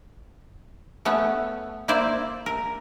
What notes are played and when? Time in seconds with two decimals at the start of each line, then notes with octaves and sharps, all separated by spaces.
1.05 A3 B3 C#4 C#5
1.88 A#3 E4 C5 D5
2.46 A#4